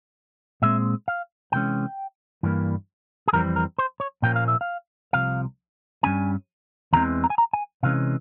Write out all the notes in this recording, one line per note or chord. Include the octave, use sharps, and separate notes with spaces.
A#2 G#3 C4 E5
F5
C3 E3 G#3 C#4 G5
G2 E3 G3 A#3
G#4
F2 E3 G3 C4 A#4
A#4
C5
C#5
A#2 F3 A#3 C#4 G5
F5
E5
F5
C2 C3 F3 F5
G2 E3 G3 C#4 G#5
E2 C#3 E3 G#3 C4 A#5
A#5
G#5
A#5
G#5
C3 E3 G#3 C#4 F5